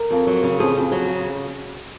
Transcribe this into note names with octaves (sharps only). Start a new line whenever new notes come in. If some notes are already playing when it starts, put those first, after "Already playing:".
Already playing: A#4
F2
F#3
C#3
F2 G#4
F2
F#3
C#3